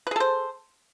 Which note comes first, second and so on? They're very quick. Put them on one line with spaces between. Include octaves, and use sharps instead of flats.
B4 G#4 A4 C5